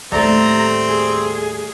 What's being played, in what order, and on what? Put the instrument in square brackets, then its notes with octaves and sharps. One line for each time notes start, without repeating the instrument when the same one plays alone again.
[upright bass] D#2 A2 [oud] G3 A3 [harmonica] C4 [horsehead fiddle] A#5
[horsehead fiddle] G#4